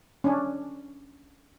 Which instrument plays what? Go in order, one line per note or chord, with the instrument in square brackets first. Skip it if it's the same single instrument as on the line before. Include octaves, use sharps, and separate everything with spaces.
[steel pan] C#4 D4